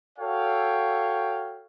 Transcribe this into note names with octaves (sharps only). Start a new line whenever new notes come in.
F#4 A4 C#5 F5 G5